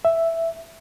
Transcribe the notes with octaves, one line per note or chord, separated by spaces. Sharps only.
E5